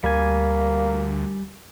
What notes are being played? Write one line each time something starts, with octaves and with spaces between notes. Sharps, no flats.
D2 G3 A#3 G#5